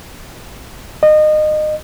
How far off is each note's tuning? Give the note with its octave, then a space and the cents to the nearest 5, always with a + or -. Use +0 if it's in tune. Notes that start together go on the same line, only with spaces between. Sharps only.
D#5 -25